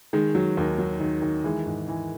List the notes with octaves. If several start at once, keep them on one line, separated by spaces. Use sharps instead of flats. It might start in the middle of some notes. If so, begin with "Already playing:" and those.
D#3 G#3
F#3
D#2
F#3
D#3
D#3
E3 G#3
G#2
E3